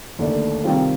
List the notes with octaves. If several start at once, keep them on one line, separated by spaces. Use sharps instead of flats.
D#2 D3 A3 D4
C3 D#3 G3 C4 F4